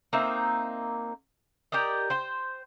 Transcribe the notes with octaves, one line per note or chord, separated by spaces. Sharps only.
A#3 C4 D#4 E5
G4 A#4 D5 D#5
C5 G5